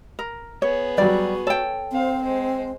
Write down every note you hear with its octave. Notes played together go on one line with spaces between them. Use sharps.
A#4
B3 G#4 C#5
F#3 G3 F#4 D5
A4 C#5 G5
C4 C5 F5
G#3 C5